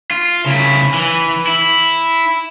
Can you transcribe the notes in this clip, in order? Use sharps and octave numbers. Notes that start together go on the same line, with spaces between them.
F4
C#3 E4
E3
E4